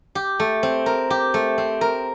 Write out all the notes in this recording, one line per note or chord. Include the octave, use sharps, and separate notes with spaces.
G4
A3
C4
A#4
G4
A3
C4
A#4